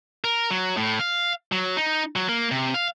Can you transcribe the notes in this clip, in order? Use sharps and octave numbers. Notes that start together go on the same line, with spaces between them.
A#4
F#3
A2
F5
F#3
D#4
F#3
A#3
C3
F5